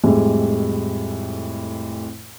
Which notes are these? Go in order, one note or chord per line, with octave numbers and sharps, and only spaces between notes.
F2 A2 G3 G#3